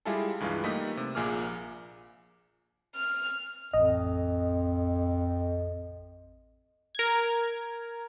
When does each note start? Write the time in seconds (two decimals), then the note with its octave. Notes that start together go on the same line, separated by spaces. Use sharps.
0.05 G3 G#3 E4 F4 G#4 A4
0.40 C#2 G2 E3 G#3 F4
0.64 G3 A3 A#3 D#4 D#6 B6
0.97 C3
1.15 A#1 A#2 G#4 D6 F6
2.94 F6
3.73 A1 F2 D#5
6.95 A#4 G#6